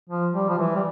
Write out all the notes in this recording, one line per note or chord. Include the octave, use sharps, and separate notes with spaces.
F3
G3
F3
E3
G3